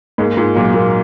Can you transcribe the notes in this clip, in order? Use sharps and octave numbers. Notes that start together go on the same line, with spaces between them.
G#2 G#3 A#3
G#2 G#3 F4
A#2 F#3 A#3
A#2 A#3 F4